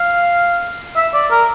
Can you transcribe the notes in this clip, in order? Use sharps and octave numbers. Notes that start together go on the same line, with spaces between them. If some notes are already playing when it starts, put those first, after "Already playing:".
Already playing: F5
E5
D5
A#4